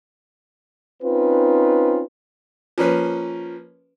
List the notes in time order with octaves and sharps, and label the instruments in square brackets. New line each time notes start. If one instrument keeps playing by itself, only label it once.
[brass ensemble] C4 C#4 D#4 F4 B4
[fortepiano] F3 A#3 C#4 B4